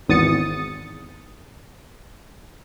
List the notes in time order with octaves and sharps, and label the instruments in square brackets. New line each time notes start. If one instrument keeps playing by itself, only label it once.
[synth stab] G#1 E2 D#6 A6 C#7